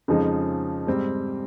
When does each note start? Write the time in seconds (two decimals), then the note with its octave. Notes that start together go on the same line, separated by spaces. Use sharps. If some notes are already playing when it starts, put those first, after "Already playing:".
0.08 F2 C#3 F3 G#3 D#4
0.87 G#2 G3 C4